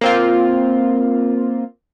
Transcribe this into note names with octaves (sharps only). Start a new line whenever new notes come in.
A#3 C4 F4